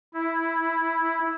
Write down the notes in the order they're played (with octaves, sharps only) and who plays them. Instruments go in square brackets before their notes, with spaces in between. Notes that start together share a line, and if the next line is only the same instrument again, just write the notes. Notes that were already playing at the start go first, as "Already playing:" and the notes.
[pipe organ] E4